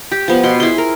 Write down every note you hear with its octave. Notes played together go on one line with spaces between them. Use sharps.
G4
F3 B3
B2 C6
E4 G#4 C6
A#4